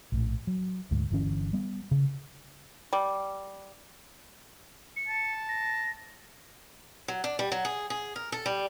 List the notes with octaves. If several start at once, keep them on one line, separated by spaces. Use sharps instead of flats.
A#1 A2
F#3
D2 G#2
G1 D3 E3 C#4
G3 B3
C#3
G3
C#7
A5
A#6
F#3
D4
G3
F#3
G#4
G#4
A#4
A4
G3